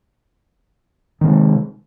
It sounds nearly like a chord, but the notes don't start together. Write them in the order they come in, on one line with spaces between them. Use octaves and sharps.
D#3 C3 G#3